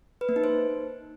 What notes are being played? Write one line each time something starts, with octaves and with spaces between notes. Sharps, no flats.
B4
A#3
D#4
C5